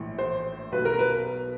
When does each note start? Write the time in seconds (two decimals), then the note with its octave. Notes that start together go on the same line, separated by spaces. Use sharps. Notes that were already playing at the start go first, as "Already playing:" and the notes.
Already playing: A#1 A2 E3
0.19 C5
0.72 B1 B2 B4
0.85 A#4
0.99 B4